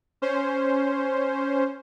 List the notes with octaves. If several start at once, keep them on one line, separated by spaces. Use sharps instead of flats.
C#4 C5